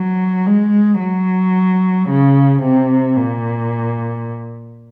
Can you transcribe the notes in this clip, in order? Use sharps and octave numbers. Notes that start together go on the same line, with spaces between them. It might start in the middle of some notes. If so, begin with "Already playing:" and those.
Already playing: F#3
G#3
F#3
C#3
C3
A#2